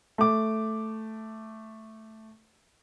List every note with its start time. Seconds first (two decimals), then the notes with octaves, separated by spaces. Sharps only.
0.18 A3 D6